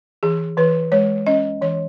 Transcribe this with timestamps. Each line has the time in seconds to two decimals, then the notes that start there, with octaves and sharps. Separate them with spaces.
0.23 E3 G#4
0.57 E3 B4
0.92 G#3 C#5
1.27 C#4 D#5
1.61 E3 C#5